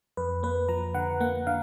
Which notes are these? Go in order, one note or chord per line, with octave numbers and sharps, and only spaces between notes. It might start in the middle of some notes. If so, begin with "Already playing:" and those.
F2 B4
A#3 B4
F3 A#5
D3 F#5
A#3 F#5
D3 F5